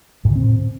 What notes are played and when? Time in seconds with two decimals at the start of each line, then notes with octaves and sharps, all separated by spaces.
0.25 A2
0.30 D3
0.36 C4